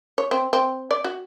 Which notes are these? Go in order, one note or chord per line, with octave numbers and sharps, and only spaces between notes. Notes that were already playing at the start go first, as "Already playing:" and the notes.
C#5
C4
C4
D5
F#4